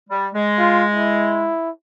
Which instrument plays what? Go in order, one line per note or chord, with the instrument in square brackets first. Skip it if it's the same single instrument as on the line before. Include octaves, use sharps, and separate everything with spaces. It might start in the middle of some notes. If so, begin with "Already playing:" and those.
[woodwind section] G3
G#3
[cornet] F4
E4